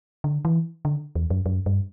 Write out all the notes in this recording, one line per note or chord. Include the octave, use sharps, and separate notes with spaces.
D3
E3
D3
E2
F#2
F#2
G2